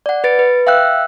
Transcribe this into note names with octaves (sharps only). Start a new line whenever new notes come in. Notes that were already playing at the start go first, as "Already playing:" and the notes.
D5 F#5
B4 A6 D7
B4
E5 F5 G5 E6 F#6